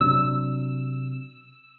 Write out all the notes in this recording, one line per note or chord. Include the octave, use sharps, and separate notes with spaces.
C3 F#3 D4 E6